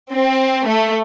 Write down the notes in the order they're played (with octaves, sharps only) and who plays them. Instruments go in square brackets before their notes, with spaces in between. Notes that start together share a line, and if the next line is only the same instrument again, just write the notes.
[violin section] C4
A3